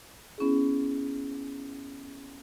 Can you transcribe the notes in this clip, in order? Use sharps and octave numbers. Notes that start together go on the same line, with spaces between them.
B3 C#4 E4 G#4